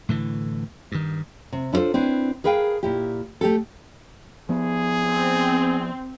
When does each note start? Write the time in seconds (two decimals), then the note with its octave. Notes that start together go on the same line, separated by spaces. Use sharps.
0.09 A2 D3 E3
0.92 G2 D#3
1.52 C3
1.72 D4 E4 F4 A4 C5
1.94 C4 D4 E4 B4
2.44 G#4 A#4 B4 F5 G5
2.83 A#2 E4 G4
3.41 A3 G4 A4
4.49 F3 B3 G#4
5.06 C4